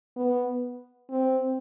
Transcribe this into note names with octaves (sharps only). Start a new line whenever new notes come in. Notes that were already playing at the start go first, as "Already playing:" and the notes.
B3
C4